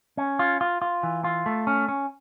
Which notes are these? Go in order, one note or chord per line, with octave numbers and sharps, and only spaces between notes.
C#4
F4
F4
F4
E3
F4
A3
C#4
C#4